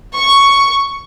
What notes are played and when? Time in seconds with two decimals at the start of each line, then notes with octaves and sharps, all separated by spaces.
0.14 C#6